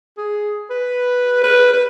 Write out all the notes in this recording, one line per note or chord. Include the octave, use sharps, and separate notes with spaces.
G#4
B4
B4
B4